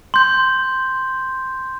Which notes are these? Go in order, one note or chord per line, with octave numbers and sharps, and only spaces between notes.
C6 G6